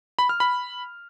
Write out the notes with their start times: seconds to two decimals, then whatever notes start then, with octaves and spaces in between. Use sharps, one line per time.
0.19 B5
0.29 F6
0.40 B5